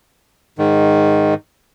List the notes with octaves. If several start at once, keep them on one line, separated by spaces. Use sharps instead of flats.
G#2 D#3